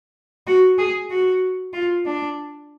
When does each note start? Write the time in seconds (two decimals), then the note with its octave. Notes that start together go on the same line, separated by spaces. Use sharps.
0.47 F#4
0.78 G#4
1.11 F#4
1.73 F4
2.06 D4